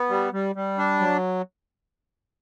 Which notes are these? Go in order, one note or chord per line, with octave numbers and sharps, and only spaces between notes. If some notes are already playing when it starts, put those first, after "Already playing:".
Already playing: B3
G3
G3
G3
D4
F#3